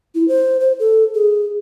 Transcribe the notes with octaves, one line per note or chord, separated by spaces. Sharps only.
E4
C5
C5
A4
G#4